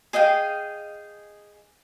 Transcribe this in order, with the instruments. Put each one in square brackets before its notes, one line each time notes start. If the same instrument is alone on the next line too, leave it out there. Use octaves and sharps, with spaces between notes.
[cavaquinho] G#4 D#5 F5 G5